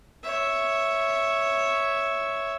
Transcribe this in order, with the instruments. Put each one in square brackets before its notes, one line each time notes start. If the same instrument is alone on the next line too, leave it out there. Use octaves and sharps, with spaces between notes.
[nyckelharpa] C#5 E5